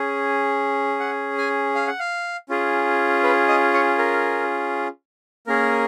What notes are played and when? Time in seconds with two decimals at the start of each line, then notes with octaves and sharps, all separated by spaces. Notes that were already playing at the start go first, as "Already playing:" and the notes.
Already playing: C#4 G#4
1.00 F#5
1.38 G#5
1.75 F5
1.87 F#5
1.99 F5
2.49 C#4 F4 G#4
3.24 B4
3.48 D#5
3.73 C#5
3.98 A#4
5.47 A#3 C#4 G#4 A#4